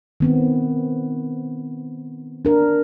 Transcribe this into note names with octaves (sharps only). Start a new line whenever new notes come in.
D#3 B3 C4
D4 A#4